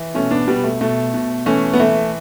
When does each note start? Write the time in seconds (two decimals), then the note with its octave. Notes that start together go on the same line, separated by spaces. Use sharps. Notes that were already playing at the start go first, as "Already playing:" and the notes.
Already playing: E3
0.15 B2 A3 C#4
0.31 B3 D4
0.47 B2 G3 B3
0.64 A3
0.81 B2 A3
1.14 B2
1.46 E3 A3 C#4
1.73 B3
1.80 E3 A3